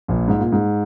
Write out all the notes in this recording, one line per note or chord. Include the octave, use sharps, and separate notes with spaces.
A#1 A#2
G#2
A#2
G#2